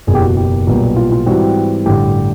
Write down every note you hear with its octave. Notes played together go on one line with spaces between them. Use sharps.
F#1 E2 B2 G#4
G4
F#4
G4
B1 A#2 G3 B3
F4
F4
G#2 E3 G3 C4 F#4
A1 G2 D3 G4